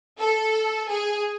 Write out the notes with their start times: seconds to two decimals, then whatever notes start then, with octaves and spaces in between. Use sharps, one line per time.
0.19 A4
0.89 G#4